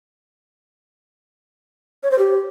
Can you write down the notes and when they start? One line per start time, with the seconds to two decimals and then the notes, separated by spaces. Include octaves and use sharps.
2.03 C#5
2.11 C5
2.19 G4